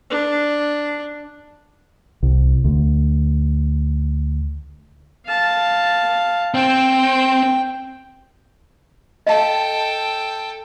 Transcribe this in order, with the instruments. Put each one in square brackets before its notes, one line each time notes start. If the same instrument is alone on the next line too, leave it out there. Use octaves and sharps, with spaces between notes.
[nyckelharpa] D4
[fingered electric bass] C2
D2
[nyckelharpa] F5 A5
[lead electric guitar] C4 [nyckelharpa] G5
[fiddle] A4 G5 [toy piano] D#5 F5 A5